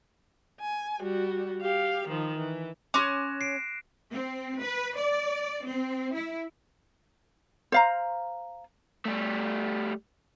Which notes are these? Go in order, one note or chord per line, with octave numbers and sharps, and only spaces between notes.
G#5
G3 F#4
G4 F5
D#3 F3
E3
C#4 C6 D6 F#6 A#6 E7
C7 D7
C4
B4
D5
C4
E4
C5 F5 A#5
G3 A3